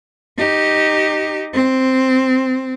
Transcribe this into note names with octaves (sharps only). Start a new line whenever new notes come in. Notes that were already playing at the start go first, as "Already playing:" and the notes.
D#4 G4
C4